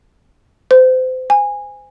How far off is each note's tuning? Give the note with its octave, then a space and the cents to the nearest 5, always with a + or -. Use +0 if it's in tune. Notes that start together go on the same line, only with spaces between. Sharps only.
C5 -30
G#5 -20